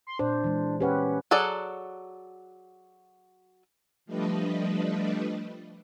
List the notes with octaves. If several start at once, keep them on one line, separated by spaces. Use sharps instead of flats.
C6
A#2 D4 C5
E3 G#3
C#4 G4 B4 F#5
F#3 G#4 A4 D5 F#5
F3 G3 A3 D4 B4 D#5